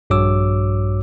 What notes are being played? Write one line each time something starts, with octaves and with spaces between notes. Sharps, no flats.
A#1 G2 F#4 C#5 D6 E6